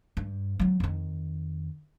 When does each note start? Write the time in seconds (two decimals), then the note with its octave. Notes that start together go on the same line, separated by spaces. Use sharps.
0.17 G2
0.59 F#3 C4
0.80 F2 D#3